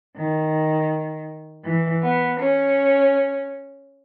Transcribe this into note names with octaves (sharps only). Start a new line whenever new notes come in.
D#3
E3
B3
C#4